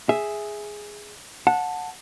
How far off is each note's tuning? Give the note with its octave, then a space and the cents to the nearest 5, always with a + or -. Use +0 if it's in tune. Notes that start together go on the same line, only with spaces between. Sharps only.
G#4 +0 E5 +0
F#5 -20 A5 +0